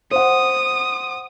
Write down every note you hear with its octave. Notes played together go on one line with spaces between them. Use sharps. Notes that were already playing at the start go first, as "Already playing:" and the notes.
C5 F#5 D#6